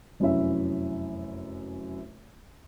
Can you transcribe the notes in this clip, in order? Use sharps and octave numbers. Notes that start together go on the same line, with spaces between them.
F1 F#2 C#4 E4 E5